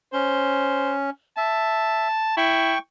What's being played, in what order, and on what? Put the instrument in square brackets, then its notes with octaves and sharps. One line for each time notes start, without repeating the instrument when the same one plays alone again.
[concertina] C#4 [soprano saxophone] C5
[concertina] E5 [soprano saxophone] A5
[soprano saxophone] E4 [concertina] G5 C#6